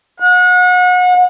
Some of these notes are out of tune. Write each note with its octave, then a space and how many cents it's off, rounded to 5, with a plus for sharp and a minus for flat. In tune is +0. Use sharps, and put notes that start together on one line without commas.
F#5 -35